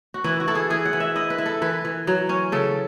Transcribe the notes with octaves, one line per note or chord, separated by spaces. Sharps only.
F#4
E3 E4
F#4
E4 A4
G#4
E3 G#4
F#5
E3
E5
E4 D#5
B4
E4
A4
E3 B4
E3
F#3
C#4
C#3 A4